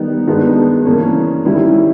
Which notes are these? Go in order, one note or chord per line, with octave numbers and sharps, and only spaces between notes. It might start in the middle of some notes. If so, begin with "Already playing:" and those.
Already playing: D#3 G3 B3 D#4
G2 D#3 G#3 B3
C#3 E3 A#3 C#4
D#3 G3 C#4 E4